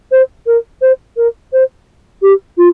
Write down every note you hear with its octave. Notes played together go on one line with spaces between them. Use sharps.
C5
A#4
C5
A#4
C5
G4
F4